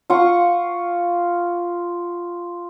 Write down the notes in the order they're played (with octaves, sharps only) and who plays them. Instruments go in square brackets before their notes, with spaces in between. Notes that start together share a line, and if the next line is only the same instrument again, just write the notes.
[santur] F4 F#5 C#6